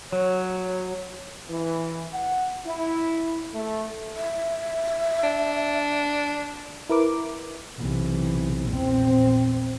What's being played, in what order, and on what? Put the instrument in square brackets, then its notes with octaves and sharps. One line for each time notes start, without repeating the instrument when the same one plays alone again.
[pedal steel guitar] F#3 [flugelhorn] C#5
[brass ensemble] E3
F#5
E4
A3
[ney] E5
[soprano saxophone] D4
[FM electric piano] E4 A#4 B4 D6
[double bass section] B1 C3 E3
A#1 E2 C4